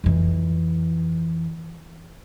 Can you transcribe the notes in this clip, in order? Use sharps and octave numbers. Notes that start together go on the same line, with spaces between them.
F2 E3